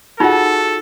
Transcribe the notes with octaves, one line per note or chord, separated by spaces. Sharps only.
D#4 F4 F#4 G#4 A4 F#5